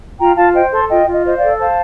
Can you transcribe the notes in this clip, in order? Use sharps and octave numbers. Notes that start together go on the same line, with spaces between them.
F4 G5 A#5
F4 F5 A5
C5 D#5 G5
A4 A5 C6
F4 D#5 G5
F4
D#5
C5 D#5
D5 F5
A4
C5 F5 A5